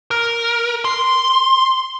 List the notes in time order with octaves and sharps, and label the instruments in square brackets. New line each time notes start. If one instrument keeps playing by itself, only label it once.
[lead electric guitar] A#4
C6